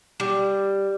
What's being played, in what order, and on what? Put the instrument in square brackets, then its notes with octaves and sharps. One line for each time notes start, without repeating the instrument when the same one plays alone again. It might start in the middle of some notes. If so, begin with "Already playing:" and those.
[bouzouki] G3